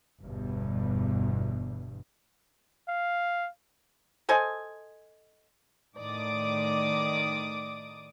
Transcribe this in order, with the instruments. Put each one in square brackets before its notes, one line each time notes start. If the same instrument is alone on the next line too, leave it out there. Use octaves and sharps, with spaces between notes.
[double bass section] G1 E2 G2 B2
[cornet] F5
[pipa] A4 C5 D#5 G#5
[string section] A2 D#3 D5 D6 D#6